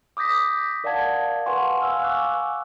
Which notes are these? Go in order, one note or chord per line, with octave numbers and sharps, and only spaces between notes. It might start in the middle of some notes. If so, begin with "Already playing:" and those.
D6 D#6 G6 A#6 B6
A#4 D5 F5 F#5 A5 G#6
B4 F5 F#5 G#5 C6 C#6
F5 F#5 G#5 E6 F6
G#5 C#6 D6 E6 F#6